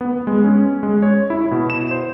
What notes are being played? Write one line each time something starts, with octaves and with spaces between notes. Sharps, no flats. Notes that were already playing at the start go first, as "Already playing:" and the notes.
B3
G#3
C#4
G#3
C#5
E4
B2
E7
C5